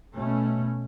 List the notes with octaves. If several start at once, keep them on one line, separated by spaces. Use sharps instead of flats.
B2 A3 C#4